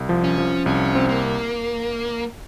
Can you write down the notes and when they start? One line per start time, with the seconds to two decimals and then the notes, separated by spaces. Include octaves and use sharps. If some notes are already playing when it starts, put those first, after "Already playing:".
Already playing: C2
0.09 F3
0.24 C#4
0.38 F3
0.66 C2 C#4
0.95 C4
1.09 A#3